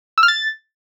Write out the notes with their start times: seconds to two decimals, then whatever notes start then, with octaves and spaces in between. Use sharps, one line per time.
0.18 E6
0.23 F6
0.28 A6